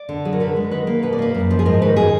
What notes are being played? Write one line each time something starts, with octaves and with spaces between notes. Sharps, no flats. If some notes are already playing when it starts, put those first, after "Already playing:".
Already playing: D5
D3
F#3 G#4
A#4
D3 B4
G#3
D#3 B4
A#3
B2 B4
D5
A#3 B4
F#2
F3
G#4
G#2 A#4
D#3 B4
G#4